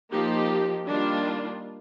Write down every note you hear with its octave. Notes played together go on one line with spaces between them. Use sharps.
F3 A#3 D#4 G4
D#3 G3 A#3 D4 F4